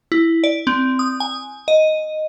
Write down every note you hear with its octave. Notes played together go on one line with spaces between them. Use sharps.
E4
D5
C4
D#6
G#5
D#5